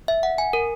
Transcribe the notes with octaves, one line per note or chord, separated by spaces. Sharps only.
E5
F#5
G#5
A#4